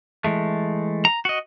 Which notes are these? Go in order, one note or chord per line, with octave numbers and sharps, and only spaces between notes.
E3 G#3 A3
A#5
F#4 D#5